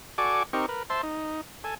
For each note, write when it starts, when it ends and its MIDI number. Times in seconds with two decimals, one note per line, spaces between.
0.18 0.43 66
0.18 0.43 69
0.18 0.43 74
0.18 0.43 80
0.18 0.43 85
0.18 0.43 86
0.53 0.66 60
0.53 0.66 63
0.53 0.66 67
0.53 0.66 70
0.53 0.66 85
0.69 0.83 70
0.69 0.83 71
0.90 1.02 72
0.90 1.02 76
0.90 1.02 81
0.90 1.02 84
1.03 1.41 63
1.64 1.75 69
1.64 1.75 80